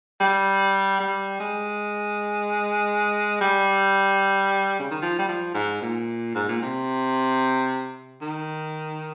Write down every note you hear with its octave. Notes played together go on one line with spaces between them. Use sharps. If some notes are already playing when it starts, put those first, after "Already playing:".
G3
G3
G#3
G3
C#3
D#3
F3
G3
F3
G#2
A#2
G#2
A#2
C3
D#3